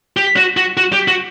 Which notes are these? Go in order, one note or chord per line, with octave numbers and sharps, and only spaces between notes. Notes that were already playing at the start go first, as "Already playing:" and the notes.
G4
F#4
F#4
F#4
G4
F#4